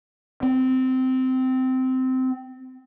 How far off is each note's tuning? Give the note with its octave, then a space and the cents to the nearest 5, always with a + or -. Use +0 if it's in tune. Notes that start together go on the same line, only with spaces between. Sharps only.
C4 -15